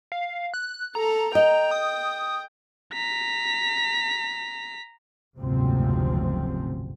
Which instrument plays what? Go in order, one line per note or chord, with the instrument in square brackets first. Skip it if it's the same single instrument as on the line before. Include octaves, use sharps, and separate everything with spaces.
[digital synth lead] F5
F#6
[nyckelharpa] A4 [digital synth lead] A#5
[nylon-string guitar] D#5 [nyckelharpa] G5
[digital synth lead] D#6
[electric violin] A#5 B6
[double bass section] F#1 D2 G#2 C3 F3 C4